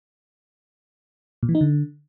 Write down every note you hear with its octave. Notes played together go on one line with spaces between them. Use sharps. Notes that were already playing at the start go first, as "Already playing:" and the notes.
A#2
E3
D#4
D3